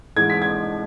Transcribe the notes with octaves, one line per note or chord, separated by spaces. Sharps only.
G#2 E3 G#3 G#6
B6
G#6